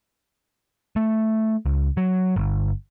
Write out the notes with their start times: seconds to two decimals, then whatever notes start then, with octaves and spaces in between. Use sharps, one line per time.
0.96 A3
1.66 C#2
1.97 F#3
2.36 G1